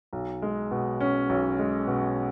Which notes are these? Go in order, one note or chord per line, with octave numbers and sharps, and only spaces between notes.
B1
G#3
B2
C#4
B1
G#3
B2